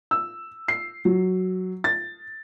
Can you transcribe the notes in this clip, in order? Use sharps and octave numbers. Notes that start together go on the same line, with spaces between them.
E6
C7
F#3
A6